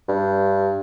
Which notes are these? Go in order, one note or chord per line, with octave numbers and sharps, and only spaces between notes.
G2